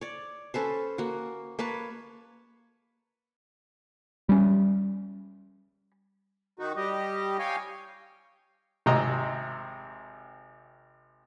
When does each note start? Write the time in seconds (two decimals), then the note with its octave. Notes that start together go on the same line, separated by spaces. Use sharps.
0.01 C#5 D5
0.54 C#4 A4 B4 C5
0.98 A#3 F#4
1.59 A#3 B4 C#5 A5
4.29 G3 C#4
6.59 D#3 D#4 F#4
6.76 G3 G4 D#5
7.39 C#5 F5 G5 G#5
8.86 G#1 C3 D#5 A#5